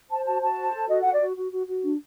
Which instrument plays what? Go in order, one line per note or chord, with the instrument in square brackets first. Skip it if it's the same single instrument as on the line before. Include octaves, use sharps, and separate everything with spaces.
[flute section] C5 A5
F#4 A5
F#4 A5
C5
A4
F#4 D#5
F#4 F#5
D5
F#4
F#4
F#4
F#4
D4